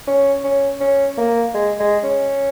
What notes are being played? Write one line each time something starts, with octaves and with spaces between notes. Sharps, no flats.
C#4
C#4
C#4
A#3
G#3
G#3
C#4